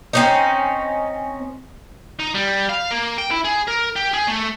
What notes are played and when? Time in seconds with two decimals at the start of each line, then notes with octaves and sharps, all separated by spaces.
0.13 C4 C#4 D#4
2.19 D#4
2.34 G3
2.69 F5
2.91 A#3
3.18 G5
3.31 E4
3.44 G#4
3.67 A#4
3.96 G4
4.13 G#4
4.28 A3